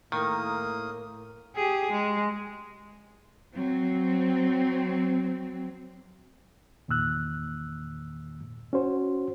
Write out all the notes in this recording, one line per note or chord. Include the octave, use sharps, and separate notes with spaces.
A2 D#3 A#3 A#4 A#5 D#6
G4 G#4
G#3
F#3 C4
E2 A#2 D#3 E6 F#6
C#4 F#4 C5